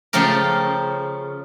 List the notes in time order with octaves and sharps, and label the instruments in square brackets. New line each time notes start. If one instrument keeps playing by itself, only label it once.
[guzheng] C#3 F3 A3 G4 A#4